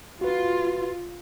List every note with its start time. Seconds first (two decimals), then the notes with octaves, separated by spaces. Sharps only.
0.21 F4 F#4 B4